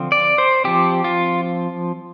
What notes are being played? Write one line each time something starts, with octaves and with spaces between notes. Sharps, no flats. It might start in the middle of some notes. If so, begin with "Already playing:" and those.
Already playing: D3 F3 C4
D5
C5
F3 C4 G4
F4